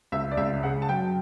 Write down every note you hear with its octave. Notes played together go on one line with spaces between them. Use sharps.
C#2 E5
D5
C#2 E5
C#3 F#5
A5
F#2 G5